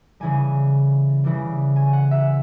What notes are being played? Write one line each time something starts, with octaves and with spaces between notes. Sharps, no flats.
C#3 E3 G3 G#5
C#3 E3 G3
G#5
F#5
E5